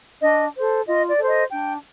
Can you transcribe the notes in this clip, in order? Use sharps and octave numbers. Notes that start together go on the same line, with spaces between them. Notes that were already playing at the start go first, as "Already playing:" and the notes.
D4 D#5
A4 C5
F4 D#5
D5
A4 C5
D#5
D4 G5